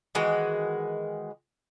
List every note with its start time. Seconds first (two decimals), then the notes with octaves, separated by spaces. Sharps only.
0.15 D#3 E3 G#3 F#4